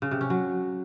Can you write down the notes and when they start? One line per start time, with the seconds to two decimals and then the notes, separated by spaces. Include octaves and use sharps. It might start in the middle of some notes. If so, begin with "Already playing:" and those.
0.02 C#3
0.11 C3
0.21 C#4
0.30 F#3